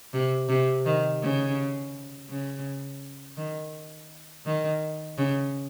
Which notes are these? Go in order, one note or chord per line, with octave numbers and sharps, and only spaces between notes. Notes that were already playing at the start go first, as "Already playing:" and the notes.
C3
C3
D#3
C#3
C#3
D#3
D#3
C#3